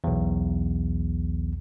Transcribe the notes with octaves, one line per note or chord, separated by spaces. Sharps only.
B1 E2